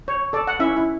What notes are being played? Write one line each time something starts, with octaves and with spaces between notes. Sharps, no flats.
C#5
A4 D5
F#5
C#4 E4 E5
E4